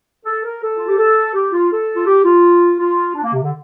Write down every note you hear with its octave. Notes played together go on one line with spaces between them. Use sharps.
A4
A#4
A4
F4
G4
A4
G4
F4
A4
F4
G4
F4
F4
D4
A#3
C3
D3